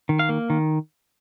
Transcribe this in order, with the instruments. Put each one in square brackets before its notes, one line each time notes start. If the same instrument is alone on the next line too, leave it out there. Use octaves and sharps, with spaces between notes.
[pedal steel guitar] D#3
F5
A#3
D#3